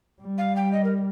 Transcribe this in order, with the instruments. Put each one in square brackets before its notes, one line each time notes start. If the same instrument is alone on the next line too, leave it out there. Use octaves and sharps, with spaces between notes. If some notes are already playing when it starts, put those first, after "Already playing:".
[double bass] G3
[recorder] F5
G5
D#5
A#4